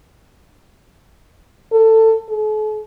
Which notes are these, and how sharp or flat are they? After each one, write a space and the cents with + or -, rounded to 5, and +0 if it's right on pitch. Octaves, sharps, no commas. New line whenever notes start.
A4 +20
A4 -45